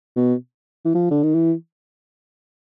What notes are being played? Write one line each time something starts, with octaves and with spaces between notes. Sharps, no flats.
B2
E3
F3
D3
D#3
E3